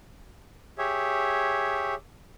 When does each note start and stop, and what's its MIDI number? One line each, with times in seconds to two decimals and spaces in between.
0.78 1.95 67
0.78 1.95 68
0.78 1.95 73
0.78 1.95 76